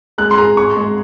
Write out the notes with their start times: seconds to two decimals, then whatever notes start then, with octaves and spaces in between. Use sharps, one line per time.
0.18 G#3 F#6
0.31 C6
0.38 G#4 A#5
0.57 G#4 C#6
0.77 G#3